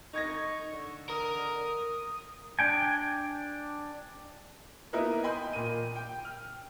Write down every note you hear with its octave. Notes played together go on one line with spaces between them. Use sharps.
D#4 D#5 C#6 G#6 A#6
D3
A#4 D#6
D4 G5 G#5
A#3 B3 D#4 E4 A#4 B4
D#5 G5 G#5 B5 C6 G6
A#2 D#7
G5
F6